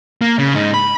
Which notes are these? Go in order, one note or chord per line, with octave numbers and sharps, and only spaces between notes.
A#3
C#3
G#2 D#4
B5